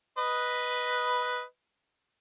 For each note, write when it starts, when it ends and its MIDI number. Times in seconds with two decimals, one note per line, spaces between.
0.18 1.42 71
0.18 1.42 75